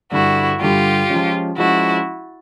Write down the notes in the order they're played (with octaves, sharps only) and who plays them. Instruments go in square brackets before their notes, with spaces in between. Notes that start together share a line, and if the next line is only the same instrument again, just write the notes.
[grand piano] G2 D3 G3 [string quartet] E4 F#4
[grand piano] G2 D3 G3 [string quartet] F4 G4
[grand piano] F3 G#3 C#4
[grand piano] F3 G#3 C#4 [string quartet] E4 F#4